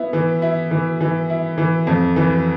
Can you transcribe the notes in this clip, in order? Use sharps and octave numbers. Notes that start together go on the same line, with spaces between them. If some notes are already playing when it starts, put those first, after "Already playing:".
Already playing: B3 E4
E3
E4
E3
E3
E4
E3
F2
E3